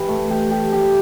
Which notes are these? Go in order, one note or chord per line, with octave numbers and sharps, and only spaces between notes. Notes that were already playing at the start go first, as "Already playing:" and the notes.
Already playing: E3 G4
A3
G4
G4
G4